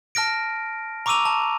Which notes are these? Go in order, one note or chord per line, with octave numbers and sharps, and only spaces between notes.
A5 F6 A#6 D7
A#5 C#6 D6 E6 D#7 F7
A5